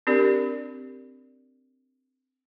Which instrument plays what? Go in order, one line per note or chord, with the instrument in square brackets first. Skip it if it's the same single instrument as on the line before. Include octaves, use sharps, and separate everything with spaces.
[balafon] C4 D4 G4 A#4 D5